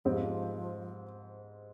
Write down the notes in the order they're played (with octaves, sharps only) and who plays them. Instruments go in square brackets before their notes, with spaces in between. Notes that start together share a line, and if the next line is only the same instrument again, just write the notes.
[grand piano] G#2 G3 C4 [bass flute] F3